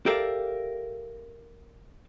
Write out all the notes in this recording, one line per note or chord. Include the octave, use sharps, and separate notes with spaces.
G4 A4 A#4 D5 E5 F5